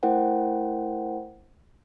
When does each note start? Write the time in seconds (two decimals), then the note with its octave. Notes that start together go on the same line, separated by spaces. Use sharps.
0.03 A3 E4 A#4 C5 F#5 G5